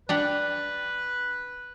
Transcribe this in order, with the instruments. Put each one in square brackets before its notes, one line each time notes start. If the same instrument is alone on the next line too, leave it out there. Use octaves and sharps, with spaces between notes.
[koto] D4 G4 F#5 [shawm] B4